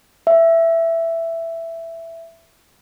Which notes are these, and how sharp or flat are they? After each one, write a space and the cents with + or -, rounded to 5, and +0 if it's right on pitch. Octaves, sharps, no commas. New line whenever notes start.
E5 +10